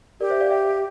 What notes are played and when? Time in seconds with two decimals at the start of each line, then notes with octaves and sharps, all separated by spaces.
0.21 G4 A#4 D5
0.30 C5 E5
0.41 D5 F5
0.51 E5 G5